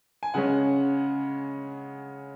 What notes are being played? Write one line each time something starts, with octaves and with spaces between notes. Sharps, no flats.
G#5
C#3 G#3 C#4 F#5